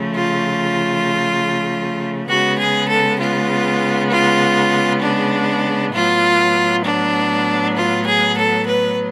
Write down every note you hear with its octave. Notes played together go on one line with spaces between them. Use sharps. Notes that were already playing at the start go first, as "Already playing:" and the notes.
Already playing: C#3 F3 A3
F4
C#3 G#3 B3 F#4
G#4
A4
F4
F4
D4
A2 F#3 B3 F4
D4
F4
G#4
A4
B4